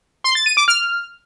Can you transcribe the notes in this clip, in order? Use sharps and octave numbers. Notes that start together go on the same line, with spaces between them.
C6
A6
D#7
D6
F6